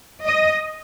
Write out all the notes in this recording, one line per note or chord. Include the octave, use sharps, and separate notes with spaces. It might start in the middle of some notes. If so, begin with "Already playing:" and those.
D#5